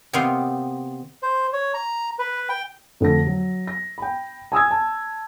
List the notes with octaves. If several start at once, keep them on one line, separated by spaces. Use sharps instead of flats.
C3 D#3 B3 C4 F5 C6
C5
C#5
A#5
B4
G5
F2 D3 A3 A#6
F#3
A#6
G5 B5
G#5 D#6 E6 G#6
A5